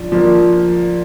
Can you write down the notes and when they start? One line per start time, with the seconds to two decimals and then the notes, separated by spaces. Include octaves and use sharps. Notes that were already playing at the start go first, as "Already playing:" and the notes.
Already playing: F3 D4
0.12 F3 A#3 D4